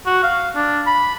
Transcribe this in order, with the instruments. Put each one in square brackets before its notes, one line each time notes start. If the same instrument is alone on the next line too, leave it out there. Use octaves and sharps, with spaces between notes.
[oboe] F#4
F5
D4
B5